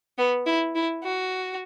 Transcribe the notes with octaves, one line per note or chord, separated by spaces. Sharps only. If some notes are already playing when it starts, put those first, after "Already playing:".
B3
E4
E4
F#4